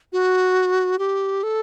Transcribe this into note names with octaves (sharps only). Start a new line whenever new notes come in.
F#4
G4
A4